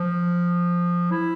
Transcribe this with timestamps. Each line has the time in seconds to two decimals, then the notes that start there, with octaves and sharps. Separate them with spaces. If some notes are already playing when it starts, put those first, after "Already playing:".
Already playing: F3
1.12 E4